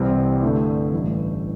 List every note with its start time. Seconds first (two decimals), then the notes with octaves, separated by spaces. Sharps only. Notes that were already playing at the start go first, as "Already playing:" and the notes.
Already playing: C2 C3 E3 G3 C4
0.42 G2 D3 A3 E4
0.93 A1 G2 E3 A3